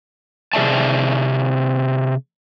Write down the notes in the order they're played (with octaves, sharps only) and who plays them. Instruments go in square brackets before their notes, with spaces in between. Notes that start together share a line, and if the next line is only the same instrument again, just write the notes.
[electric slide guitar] C3 G#4 D5 E5 A5